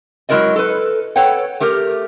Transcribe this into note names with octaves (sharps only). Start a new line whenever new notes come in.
F#3 G#3 E4 A#4 D5 D#5
A4 B4
A4 B4 C#5 F#5 G5
A3 G4 A#4